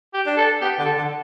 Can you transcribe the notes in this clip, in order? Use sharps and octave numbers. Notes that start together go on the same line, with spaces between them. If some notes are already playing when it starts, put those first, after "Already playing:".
G4
D4
A4
B3 G4
D3
A4
D3